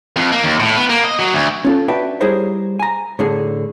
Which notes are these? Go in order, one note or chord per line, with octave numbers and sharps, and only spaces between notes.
F2
A#3
D#2
A2
B3
A#3
D#5
F#3
D2
C#4 F4 A4
D4 F#4 B4 E5 G5
G3 E4 G#4 A#4 C5 C#5
G#5 A#5
A2 D3 G#4